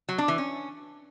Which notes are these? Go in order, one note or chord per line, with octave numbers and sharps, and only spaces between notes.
F#3
D4
E3
C#4